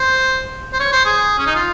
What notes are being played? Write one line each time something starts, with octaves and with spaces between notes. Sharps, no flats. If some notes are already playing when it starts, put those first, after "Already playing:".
Already playing: C5
C5
C#5
C5
G#4
C#4
D#4
F4